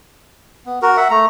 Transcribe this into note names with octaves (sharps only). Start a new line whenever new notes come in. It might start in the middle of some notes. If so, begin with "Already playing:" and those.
B3
F#4 A#4
E5 F#5
A3 A#5